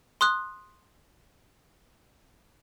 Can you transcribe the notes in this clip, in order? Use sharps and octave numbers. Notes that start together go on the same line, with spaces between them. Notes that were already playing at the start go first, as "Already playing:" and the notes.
C6 D#6 F#6